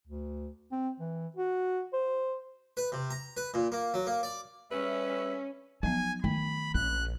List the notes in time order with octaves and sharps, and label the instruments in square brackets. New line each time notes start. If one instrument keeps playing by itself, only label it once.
[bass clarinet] D2
C4
E3
F#4
C5
[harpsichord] B4
C3
A#5
B4
A#2
A#3
F#3
A#3
D5
[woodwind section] G3 E5 [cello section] C#4 [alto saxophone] B4
[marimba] F3 F#3 B3 [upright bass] D#4 [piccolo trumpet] G#5
[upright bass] D#3 [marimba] A3 [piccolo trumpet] B5
[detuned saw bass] A#1 [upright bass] C#4 [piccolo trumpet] F#6